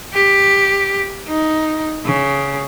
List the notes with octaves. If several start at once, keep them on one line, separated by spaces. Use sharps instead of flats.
G4
D#4
C#3